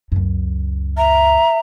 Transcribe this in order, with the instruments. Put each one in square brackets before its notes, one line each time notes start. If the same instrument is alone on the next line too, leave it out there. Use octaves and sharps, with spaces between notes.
[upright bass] C#2 F#2
[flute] E5 [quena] A#5